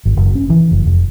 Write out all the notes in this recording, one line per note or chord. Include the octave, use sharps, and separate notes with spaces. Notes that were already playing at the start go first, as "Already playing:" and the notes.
G#1
F#1
C#4
E3
F#1
F1